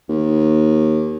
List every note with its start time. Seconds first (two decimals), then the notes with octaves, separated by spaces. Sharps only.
0.09 D#2